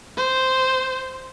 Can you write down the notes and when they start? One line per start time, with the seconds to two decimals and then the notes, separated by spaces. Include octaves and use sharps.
0.17 C5